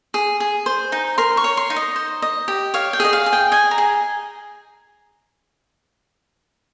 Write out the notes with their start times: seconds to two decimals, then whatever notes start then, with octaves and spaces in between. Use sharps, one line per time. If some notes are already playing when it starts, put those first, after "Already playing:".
0.14 G#4
0.40 G#4
0.66 C5
0.92 D#4
1.18 A#4 C6
1.37 C#6
1.44 C#5
1.57 C6
1.70 D#4
1.76 D#5
1.96 C5
2.22 D#5
2.48 G4
2.74 C#5 F5
2.93 G5
3.00 G#4 D#5
3.13 F5
3.26 G#4
3.33 G5
3.52 D#5 G#5
3.71 A#5
3.78 G#4